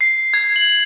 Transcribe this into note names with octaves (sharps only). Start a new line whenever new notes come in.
C7
G#6
F#7